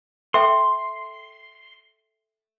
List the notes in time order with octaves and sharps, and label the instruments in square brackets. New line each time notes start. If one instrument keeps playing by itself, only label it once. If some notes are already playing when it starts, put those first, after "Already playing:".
[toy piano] A4 E5 G5 [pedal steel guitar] C6